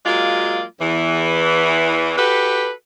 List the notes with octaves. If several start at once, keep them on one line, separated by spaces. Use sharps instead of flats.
F#3 G#3 A#3 F4 D5
E2 E3
F#4 G4 A4 B4